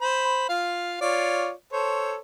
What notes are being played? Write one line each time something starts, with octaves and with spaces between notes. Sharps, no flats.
C5 B5
F4 F5
F4 C#5 D5
A4 C5 C#5